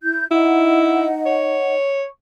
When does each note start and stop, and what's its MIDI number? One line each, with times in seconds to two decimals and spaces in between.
0.03 0.25 64
0.03 0.25 91
0.31 1.74 63
0.31 1.07 64
0.31 1.74 75
0.31 1.74 78
1.26 2.05 73